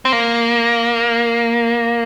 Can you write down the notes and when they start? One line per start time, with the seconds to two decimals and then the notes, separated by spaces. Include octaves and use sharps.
0.05 C4
0.12 A#3